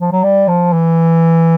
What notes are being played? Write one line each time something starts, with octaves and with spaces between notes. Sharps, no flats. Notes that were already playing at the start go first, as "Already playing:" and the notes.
F3
F#3
G3
F3
E3